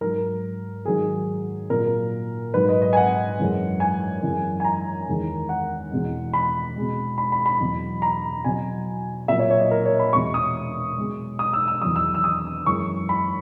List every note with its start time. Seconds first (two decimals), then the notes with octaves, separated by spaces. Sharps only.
0.01 G#2 F#3 A#4
0.85 G#2 D#3 F#3 G#4
1.70 A#2 F#3 A#4
2.54 G#2 F#3 B4
2.69 D#5
2.82 D#5
2.93 G#5
2.97 F#5
3.39 F#2 E3 G#3
3.80 G#5
4.23 F#2 E3 G#3
4.60 G#5
4.65 A#5
5.08 E2 D#3 G#3
5.49 F#5
5.92 E2 B2 G#3
6.33 B5
6.76 B2 G#3
7.18 B5
7.32 B5
7.46 B5
7.60 E2 B2 F#3
8.02 A#5
8.44 B2 F#3 G#5
9.28 A#2 F#3 E5
9.39 C#5
9.50 C#5
9.60 D#5
9.71 A#4
9.85 C#5
9.99 B5
10.13 E2 B2 G#3 C#6
10.34 D#6
10.98 B2 G#3
11.39 D#6
11.53 E6
11.68 E6
11.82 E2 D#3 F#3 D#6
11.96 E6
12.14 E6
12.24 D#6
12.66 F#2 E3 G#3 C#6
13.09 B5